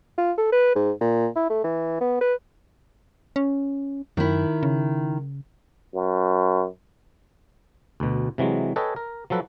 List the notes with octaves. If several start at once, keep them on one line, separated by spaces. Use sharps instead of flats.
F4
A4
B4
G#2
A#2
E4
A3
E3
B3
B4
C#4
F#2 D#3 E4
C#3
F#2
D2 B2
C3 E3 F#3 G#3
A4 B4 C#5 D#5 G5 G#5
A#4
F3 F#3 A4 B4